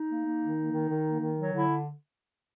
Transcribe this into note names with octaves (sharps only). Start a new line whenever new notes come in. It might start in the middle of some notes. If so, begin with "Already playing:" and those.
Already playing: D#4
A#3
A#3
D#3
A#3
D#3
D#3
A#3
D#3
F#3
D3 E4